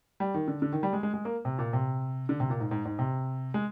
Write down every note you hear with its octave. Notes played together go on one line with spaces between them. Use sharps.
G3
D#3
D3
D3
D#3
G3
G#3
G#3
G#3
A#3
C3
A#2
C3
D3
C3
A#2
G#2
G#2
G#2
C3
G#3